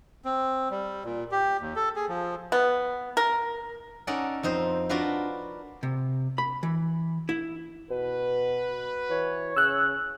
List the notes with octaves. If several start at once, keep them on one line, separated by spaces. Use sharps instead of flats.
C4
G3
A#2
G4
D#2
A4
G#4
F3
B3
A#4
C#4 D#4 A4 A#4 D5 F#5
F2 D#4 C5
D4 F4 F#4 A#4 B4 F5
C3
B5
E3
E4
B2 F#4 B4
E3 C#5
C#3 E6 F#6